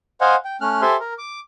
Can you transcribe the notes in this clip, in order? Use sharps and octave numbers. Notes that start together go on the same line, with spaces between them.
C5 D#5 F5 F#5 G#5
G5
A3 C#4 F6 F#6
G4 A4 C5 E5 G#5 C6
A#4
D6